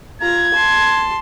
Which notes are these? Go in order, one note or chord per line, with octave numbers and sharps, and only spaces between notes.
F4 A#5 G#6
A5 C6